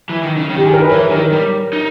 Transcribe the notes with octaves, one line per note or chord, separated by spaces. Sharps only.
E3
D#3
C#3
D#3
G4
G#4
A#4
B4
E3 C#5
D#3 A#4
G3
D#4